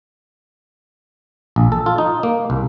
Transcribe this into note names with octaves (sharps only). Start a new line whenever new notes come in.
A#1
A4
F4
D#4
A#3
C2